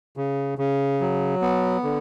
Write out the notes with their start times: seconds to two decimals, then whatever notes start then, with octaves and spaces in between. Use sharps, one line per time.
0.17 C#3
0.58 C#3
1.01 F#3
1.42 B3
1.84 D3